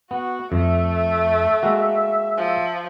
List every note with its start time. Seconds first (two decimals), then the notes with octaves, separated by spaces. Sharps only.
0.11 B3 F#4
0.52 F2 A3 E5
1.63 G#3 A#3 F#4
2.37 F3